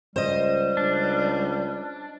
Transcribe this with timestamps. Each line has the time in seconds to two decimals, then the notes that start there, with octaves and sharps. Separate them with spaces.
0.16 C#2 G3 C5 D#5
0.77 C#2 D4